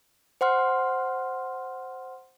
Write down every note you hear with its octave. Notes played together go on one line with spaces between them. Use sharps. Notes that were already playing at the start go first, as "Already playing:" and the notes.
C5 F#5 C6 F6